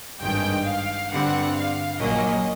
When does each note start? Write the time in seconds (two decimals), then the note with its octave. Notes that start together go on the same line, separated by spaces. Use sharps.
0.21 G#1 G2 D#3 G#3 G5
0.66 F5
1.10 G2 D3 G3 C4 F#5
1.55 F5
2.00 A#1 A#2 F#3 A#3 C#4 D#5